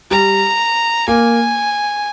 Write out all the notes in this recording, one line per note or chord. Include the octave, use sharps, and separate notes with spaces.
G3 A#5
A#3 G#5